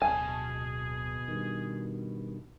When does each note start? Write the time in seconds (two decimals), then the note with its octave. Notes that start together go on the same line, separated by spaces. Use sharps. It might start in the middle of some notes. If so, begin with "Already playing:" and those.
0.02 D1 B2 G#4 G#5 A5
1.28 G2 D#3